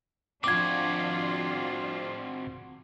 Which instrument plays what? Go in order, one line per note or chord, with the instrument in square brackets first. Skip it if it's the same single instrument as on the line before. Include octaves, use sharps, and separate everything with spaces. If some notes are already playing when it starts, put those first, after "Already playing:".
[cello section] F3 D4 F4 [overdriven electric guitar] C4 F#4 [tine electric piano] D6 G#6